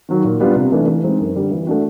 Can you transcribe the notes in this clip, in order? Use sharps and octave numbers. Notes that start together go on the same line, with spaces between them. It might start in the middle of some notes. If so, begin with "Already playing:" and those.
D#3 F#3
A#2
G3 B3 D4 F4
C3
E3 A3 D4
E3
G#3 C4 D#4
F#2
D3 G3
E3
A3 D4 F#4